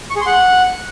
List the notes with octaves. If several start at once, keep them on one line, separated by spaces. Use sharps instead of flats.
C#6
G#4
C6
F#5